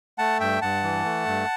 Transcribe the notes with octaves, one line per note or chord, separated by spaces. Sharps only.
A3 F#5 A5
G2 E5 G5
G2 F#5 A5
E3
A3
G2